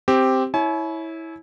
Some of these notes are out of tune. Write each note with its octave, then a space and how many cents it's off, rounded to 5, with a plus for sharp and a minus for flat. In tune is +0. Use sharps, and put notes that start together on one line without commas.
C4 +0 G4 +0
E4 -15 C#5 +0 G#5 +45